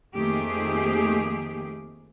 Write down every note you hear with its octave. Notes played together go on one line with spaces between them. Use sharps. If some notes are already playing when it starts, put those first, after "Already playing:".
F2 D#3 A3 A#3 G4 G#4